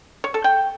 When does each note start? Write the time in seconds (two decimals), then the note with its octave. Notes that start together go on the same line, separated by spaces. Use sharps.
0.24 C#5
0.34 A4
0.44 G5